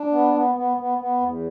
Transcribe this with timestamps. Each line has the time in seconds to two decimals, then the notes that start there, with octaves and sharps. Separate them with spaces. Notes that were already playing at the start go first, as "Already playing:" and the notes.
Already playing: D4
0.11 B3
0.34 B3
0.55 B3
0.77 B3
0.98 B3
1.21 E2